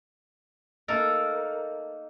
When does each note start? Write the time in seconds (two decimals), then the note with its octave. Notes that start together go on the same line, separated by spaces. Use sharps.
0.88 A#3 D#4 A4 A#4